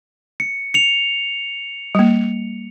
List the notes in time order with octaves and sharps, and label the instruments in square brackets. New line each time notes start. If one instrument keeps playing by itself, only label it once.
[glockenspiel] C#7
C#7 F7
[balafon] G3 A#3